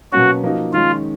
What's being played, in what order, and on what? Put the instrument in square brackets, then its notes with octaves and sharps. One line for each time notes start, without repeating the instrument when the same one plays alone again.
[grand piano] B2 F#3 A#3 C#4 [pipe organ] F#4
[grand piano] F3 A#3 D#4 F#4
[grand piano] D#3 G#3 C#4 [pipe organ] F4